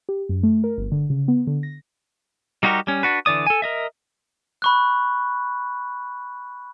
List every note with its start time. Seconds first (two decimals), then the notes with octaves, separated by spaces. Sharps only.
0.09 G4
0.29 F#2
0.43 A3
0.64 A#4
0.78 G1
0.92 D3
1.10 C#3
1.28 B3
1.47 D3
1.63 A#6
2.63 G3 D#4 F#4 G4 A#4
2.87 G3 C#4
3.03 D4 F#4 B4
3.26 D3 E3 D5 D#6
3.47 A4 G#5
3.62 A#4 D#5 E5
4.62 B5 C#6 F#6